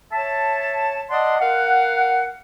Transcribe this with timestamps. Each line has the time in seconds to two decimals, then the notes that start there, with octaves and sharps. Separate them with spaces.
0.12 C#5 E5 A5
1.09 D5 D#5 F#5 A5 C6
1.39 A#4 F5 F#5